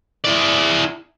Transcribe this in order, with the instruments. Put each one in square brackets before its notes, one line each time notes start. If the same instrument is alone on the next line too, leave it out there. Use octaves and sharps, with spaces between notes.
[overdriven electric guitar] E4 D5